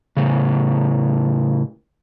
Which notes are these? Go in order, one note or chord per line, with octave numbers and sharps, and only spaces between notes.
A2 C#3